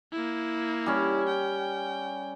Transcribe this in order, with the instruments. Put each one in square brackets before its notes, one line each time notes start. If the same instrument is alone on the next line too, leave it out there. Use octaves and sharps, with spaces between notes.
[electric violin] A#3 E4
[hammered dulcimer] G3 C#4
[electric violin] G5